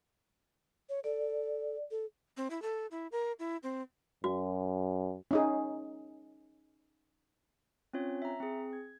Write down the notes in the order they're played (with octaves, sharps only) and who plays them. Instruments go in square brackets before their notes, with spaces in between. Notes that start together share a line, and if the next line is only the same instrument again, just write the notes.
[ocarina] C#5
[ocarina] A4 [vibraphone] D5
[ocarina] A4
[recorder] C4
E4
A4
E4
A#4
E4
C4
[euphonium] F#2 [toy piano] F#4
[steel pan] C#4 D#4 G#4
[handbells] C4 C#4 F4 C#5
E5 A#5
C4 G#4
G#6